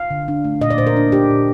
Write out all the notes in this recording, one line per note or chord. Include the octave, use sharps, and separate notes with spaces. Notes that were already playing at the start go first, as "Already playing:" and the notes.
Already playing: F5
D3
D4
A3
A#2 D#5
D5
A#2 C5
A#4
D4
D4 G4
A#2